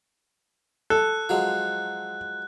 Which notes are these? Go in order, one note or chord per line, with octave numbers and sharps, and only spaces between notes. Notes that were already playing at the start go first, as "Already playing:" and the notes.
A4 F#6
F3 F#3 G#3